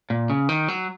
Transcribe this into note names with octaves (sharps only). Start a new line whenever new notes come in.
A#2
C#3
D#3
F#3